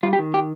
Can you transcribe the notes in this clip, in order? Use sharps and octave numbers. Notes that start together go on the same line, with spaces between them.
G3 F4
G4
D#3
G4